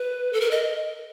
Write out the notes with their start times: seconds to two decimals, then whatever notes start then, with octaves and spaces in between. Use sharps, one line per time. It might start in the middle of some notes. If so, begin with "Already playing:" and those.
Already playing: B4
0.33 A4
0.41 A#4
0.51 D#5